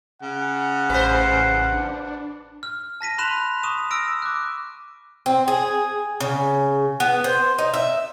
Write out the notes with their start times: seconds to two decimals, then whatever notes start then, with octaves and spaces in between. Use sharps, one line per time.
0.22 C#3 F#5
0.90 A1 B4 C5
1.72 D4
2.63 F6
3.01 A5 A#6 B6 D#7
3.18 B5 C6 F#6 E7 F7
3.63 C#6 D#6 D#7 E7
3.91 E6 F6 A#6 D7
4.22 D6 F#6
5.26 C4
5.48 G#4
6.20 C#3
7.00 B3
7.24 C5
7.58 D#4
7.74 E5